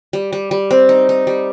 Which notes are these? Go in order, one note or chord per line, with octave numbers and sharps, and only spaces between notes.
G3
G3
G3
C4
D#4
D#4
G3